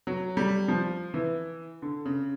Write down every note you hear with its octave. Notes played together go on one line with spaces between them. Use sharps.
F#3
G3
F3
E3
D3
C#3